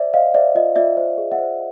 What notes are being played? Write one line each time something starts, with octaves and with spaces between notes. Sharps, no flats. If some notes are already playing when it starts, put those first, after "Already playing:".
Already playing: C5 D5 E5
C5 D#5 F5
C5 D5 E5
F4 D#5
F4 D5 E5
C5
G#4
E5 F#5
C5